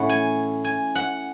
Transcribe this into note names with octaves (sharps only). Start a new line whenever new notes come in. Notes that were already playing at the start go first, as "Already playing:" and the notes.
Already playing: A2 E3 A3 C#4 F#5
G#5
G#5
F#5